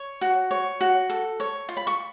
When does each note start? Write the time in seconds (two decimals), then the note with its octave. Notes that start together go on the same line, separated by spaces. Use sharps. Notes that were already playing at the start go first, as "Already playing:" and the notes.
Already playing: C#5
0.21 F#4
0.51 C#5
0.81 F#4
1.10 A4
1.40 C#5
1.69 F4
1.77 B5
1.87 C#6